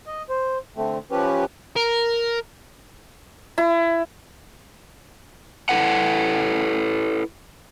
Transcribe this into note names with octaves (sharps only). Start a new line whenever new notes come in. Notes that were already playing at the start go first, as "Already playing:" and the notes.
D#5
C5
D3 A3 C4
F3 C#4 G4 B4
A#4
E4
E4 A4 B4 F#5